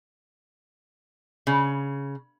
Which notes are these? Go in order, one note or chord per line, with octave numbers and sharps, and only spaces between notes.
C#3